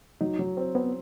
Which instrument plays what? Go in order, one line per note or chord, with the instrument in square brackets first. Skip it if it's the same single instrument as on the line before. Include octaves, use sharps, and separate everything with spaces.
[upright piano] F#3 [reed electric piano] D#4
[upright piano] F#3
C4
[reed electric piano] B3 [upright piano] C4